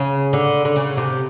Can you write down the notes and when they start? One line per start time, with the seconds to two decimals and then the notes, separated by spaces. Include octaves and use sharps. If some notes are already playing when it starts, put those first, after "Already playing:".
Already playing: C#3
0.33 D3
0.65 D3
0.76 C#3
0.97 C3